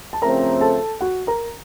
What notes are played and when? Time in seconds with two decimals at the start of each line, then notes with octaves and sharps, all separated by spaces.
0.13 A5
0.22 C#3 F3 A3 C4 A#4 A#5
0.61 A4 A5
1.01 F#4 F#5
1.27 A#4 A#5